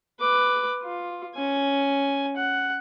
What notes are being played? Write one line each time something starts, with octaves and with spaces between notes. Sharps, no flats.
B4 D6
F4
C#4 G#5
F#5